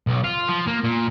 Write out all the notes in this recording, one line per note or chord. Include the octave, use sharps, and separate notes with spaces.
B1
F4
F3
A#3
A#2